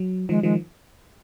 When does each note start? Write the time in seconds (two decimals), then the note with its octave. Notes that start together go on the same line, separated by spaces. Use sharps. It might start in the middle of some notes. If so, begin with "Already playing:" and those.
Already playing: F#3
0.29 D#3 F3 G#3
0.43 D#3 F3 G#3